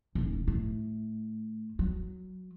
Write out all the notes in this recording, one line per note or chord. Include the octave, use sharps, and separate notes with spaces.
D#1 A2
A2
F#3